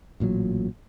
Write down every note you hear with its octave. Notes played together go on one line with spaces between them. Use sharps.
A1 A#2 D#3 F#3